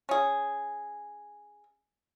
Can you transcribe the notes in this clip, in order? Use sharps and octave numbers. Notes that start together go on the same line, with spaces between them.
C#4 G#4